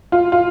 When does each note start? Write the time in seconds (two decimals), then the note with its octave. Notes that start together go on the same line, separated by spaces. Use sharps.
0.12 F4
0.32 F4